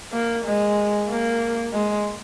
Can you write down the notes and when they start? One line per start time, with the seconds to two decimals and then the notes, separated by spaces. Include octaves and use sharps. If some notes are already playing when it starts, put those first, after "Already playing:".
0.13 A#3
0.45 G#3
1.09 A#3
1.73 G#3